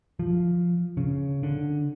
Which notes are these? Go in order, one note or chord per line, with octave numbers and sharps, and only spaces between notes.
F3
C#3
D3